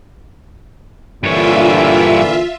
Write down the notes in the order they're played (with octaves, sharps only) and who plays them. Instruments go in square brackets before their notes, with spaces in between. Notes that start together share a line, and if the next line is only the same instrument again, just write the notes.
[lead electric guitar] G2 C#5 [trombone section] A#2 D3 E3 [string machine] F4 E5